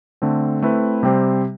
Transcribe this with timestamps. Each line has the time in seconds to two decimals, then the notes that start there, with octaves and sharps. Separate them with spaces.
0.22 D3 A3 C4
0.62 A3 C4 E4 B4
1.03 C3 G3 C4 G4 C5